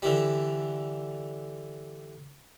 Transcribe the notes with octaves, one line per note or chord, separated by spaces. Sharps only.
D3 E3 G3